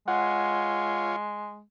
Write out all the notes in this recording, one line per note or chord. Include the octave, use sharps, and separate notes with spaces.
G#3 F4 C#5 F#5